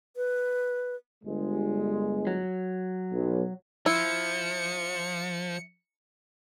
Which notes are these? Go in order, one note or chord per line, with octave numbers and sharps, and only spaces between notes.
B4
G1 G#3
F#3
B1
F3 E4 C#7